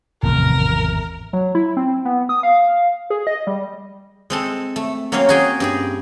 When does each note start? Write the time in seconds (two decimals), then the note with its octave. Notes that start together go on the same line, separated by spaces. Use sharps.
0.23 G#1 E2 A2 C3 F3 A#4
1.33 F#3
1.55 E4
1.77 C4
2.05 B3
2.29 D#6
2.43 F5
3.10 G#4
3.27 D#5
3.47 G3
4.30 G#3 C4 A4
4.76 A3
5.12 F#3 A#3 C4 C#4 C#5 F5
5.29 F#4 G#4 G5
5.60 G2 G4 G#4